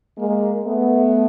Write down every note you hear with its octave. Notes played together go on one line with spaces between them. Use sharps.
G#3 A#3
A3 B3